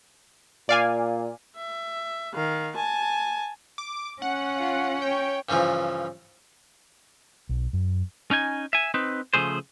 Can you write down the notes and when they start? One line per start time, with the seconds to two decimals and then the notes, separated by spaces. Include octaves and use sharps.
0.69 A#2 D5 F5 G#5
1.56 E5
2.34 D#3 F5
2.76 G#5 A5
3.78 D6
4.22 C#4 F#5
4.57 F4
5.02 C#5 G5
5.49 G2 C#3 E3 F3
7.49 B1
7.73 F#2
8.31 C#4 D#4 G#5
8.73 E5 G#5
8.94 C4 D#4 B4
9.33 C#3 F3 A3 G#4 C5